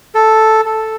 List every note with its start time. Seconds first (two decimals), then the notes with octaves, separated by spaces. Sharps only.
0.15 A4
0.66 A4